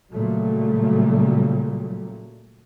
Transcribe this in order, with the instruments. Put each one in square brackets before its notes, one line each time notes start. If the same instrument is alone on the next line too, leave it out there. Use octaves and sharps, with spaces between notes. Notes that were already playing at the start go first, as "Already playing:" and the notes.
[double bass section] A#2 C#3 F#3 G3 A3